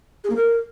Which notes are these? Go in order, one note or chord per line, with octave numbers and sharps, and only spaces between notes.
G#4
A#3
A#4